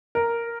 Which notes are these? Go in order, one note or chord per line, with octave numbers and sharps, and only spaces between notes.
A#4